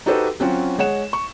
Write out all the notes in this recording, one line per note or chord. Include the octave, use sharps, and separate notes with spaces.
D#4 F#4 G4 A4 B4 C5
F#3 C4 C#4 F4 F#4
G#3 C#5 F#5 E7
C#6